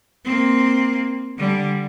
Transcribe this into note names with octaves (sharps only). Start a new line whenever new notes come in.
A#3 C4
D3 G3